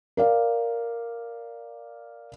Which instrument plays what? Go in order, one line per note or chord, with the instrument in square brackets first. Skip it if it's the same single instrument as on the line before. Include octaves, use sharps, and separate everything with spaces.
[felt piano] A#4 D5 F5